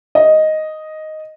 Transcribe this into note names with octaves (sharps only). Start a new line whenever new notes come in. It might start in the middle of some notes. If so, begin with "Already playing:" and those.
D#5